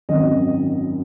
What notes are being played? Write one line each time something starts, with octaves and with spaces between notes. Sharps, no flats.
G#1 F#2 D#3 D#5